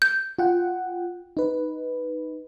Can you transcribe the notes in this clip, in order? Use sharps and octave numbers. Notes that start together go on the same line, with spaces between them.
G6
F4 F#5 G5
D#4 B4